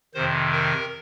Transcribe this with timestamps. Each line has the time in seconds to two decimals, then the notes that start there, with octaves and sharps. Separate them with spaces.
0.14 F2 C3 D#3 C5
0.52 A#4